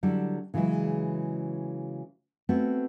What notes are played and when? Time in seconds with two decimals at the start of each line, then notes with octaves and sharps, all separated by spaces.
0.03 D3 F#3 G3 E4
0.54 C#3 E3 F#3 G#3 E4
2.49 A3 B3 C4 F#4